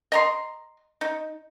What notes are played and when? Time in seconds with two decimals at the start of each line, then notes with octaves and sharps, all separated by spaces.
0.12 D#5 A#5 C6
1.01 D#4